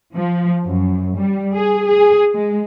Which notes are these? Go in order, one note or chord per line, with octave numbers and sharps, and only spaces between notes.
F3
F#2
G3
G#4
G#4
G#3